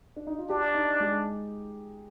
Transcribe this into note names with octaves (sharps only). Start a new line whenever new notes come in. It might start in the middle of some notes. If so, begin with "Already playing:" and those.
D4
D#4
F4
D4 G4
D#4
G#3